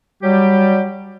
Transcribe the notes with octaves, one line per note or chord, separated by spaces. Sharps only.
F#3 G3 G4